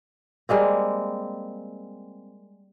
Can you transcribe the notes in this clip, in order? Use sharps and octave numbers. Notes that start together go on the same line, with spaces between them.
G3 G#3 A#3 C4